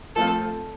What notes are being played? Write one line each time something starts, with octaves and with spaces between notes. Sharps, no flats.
F3 A3 C4 F4 A4